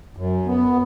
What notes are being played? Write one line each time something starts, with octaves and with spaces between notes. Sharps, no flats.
F#2
B3